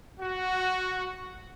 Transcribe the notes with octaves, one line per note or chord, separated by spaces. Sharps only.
F#4